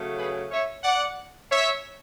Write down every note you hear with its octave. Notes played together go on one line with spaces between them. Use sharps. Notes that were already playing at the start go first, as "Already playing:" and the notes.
Already playing: C#3 F#3 A3
G#4 B4
C#5 E5
D5 F#5
C#5 E5